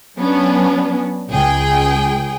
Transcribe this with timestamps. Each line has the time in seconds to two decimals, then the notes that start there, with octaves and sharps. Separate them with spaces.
0.19 F#3 B3 C#4 D4
1.30 C#2 G#4 G5